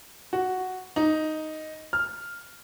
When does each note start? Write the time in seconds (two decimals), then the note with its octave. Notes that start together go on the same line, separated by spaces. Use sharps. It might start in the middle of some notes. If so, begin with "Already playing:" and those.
0.33 F#4
0.96 D#4
1.93 F6